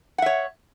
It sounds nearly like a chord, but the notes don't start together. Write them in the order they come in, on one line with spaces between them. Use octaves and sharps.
F#5 E5 C#5